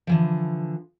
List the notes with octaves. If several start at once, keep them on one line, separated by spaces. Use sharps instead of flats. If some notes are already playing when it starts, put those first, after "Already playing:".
D3 E3 F3